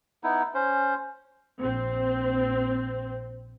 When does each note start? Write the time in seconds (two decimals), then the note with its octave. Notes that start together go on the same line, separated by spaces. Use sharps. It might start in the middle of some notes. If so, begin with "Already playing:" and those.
0.24 B3 D#4 E4
0.54 C#4 C5
1.61 A#1 C4